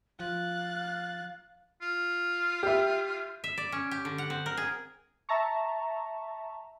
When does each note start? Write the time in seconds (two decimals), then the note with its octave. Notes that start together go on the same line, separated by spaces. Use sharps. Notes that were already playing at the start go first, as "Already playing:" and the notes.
0.20 F3 F5 F#6 A6
1.82 F4
2.63 G4 E5
3.44 E5
3.58 D5
3.72 C#4
3.91 G4
4.05 D3
4.18 F#5
4.30 C4
4.46 A#4
4.57 G#4
5.29 E5 A5 A#5 C#6